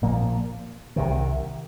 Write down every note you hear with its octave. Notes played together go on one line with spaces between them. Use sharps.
A#1 A#2 F3 A#3
C2 C3 D#3